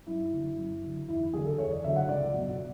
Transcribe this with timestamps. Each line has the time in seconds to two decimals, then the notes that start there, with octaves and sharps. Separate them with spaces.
0.07 F#2 E4
0.32 D3 F#3
0.57 F#2
0.83 D3 F#3
1.08 E2 E4
1.33 D3 F#3 G#4
1.45 A4
1.58 E2 C#5
1.71 D5
1.84 D3 F#3 E5
1.96 F#5
2.09 C#2 D5
2.34 B2 F#3